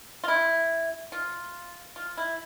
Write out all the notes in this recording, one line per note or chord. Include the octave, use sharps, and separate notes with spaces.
F4
E4
F4
F4
E4